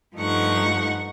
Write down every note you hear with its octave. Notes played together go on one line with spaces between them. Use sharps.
G2 F3 A3 D#4 F#5 C#6